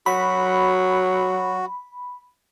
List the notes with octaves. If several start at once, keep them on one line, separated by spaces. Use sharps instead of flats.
F#3 F#4 B5